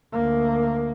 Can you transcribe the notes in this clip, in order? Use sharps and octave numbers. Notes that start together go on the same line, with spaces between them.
D2 A#3